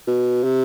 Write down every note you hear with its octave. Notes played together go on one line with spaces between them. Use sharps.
B2
C3